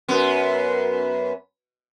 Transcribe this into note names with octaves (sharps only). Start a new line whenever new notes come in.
F#2 B3